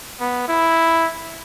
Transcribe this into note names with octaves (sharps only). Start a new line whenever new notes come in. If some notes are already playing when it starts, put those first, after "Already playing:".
B3
E4